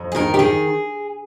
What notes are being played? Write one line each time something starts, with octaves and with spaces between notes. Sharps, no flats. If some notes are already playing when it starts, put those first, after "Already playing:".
Already playing: F2
G#4
D#3 A#4
G4
D#3 G#4